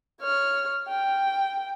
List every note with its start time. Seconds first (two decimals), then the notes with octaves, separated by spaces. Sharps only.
0.22 C#5 F6
0.89 G5